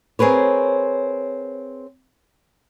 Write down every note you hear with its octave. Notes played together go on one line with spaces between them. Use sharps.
C4 G#4 A#4 B4 C#5